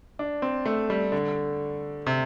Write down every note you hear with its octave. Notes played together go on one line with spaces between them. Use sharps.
D4
C4
A3
G3
D3
C3